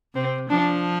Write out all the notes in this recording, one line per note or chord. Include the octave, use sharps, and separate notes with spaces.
C3 C4
F3 D4